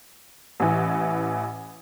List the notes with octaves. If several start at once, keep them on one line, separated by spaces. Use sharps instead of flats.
A1 E3